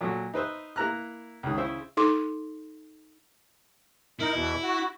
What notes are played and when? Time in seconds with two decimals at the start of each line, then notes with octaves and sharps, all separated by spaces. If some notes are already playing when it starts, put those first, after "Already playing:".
0.01 A#2 F#3 F#4 A4
0.34 D#4 B4 C5 E5
0.76 A#3 E4 B4 A#5 F6 F#6
1.43 C#2 D#3
1.57 C#3 E4 C5 E5 E6
1.97 D#4 A4 C6 D6
4.20 D#4 E4 A#4
4.34 E2 B2 E3
4.63 F#4